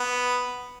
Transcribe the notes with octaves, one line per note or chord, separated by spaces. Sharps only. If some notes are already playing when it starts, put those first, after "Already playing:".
Already playing: B3